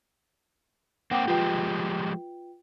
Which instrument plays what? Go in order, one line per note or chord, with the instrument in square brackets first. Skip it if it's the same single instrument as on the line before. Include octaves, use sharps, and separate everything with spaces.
[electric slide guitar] A#3 C4 [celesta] F#5 G5 D6
[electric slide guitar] F3 G#3 G4 [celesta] F4 B4 G5